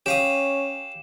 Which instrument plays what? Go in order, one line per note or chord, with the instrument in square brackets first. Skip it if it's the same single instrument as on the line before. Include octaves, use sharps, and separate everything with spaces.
[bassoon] C#4 [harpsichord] G4 F5 D#6 [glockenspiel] E7